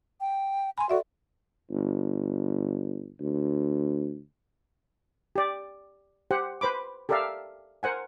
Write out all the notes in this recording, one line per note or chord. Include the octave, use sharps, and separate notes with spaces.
G5
G#5 B5 C6
F#4 A4 D5 E5
G1
D2
G4 D5
G4 C5 F#5
B4 C5 B5 D6
G4 A4 A#4 D5 E5 F5
A#4 C5 F#5 G#5